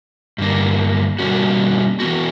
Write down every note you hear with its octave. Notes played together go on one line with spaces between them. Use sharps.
G2 D3 A#3
B2 G3 A#3 C#4 F#4
E3 B3 F#4